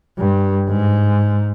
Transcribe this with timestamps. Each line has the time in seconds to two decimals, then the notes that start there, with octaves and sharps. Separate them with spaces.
0.18 G2
0.69 G#2